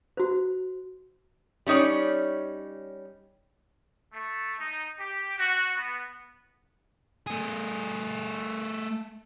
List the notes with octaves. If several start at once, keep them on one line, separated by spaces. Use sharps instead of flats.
F#4 C5
G3 C#4 D#4 C#5 D5
A3
D#4
G4
F#4
B3
A3 G#4